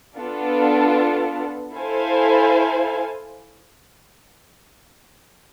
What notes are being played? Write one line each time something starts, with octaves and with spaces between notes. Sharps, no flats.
B3 D4 F4 A4
E4 A4 C5 F5 G#5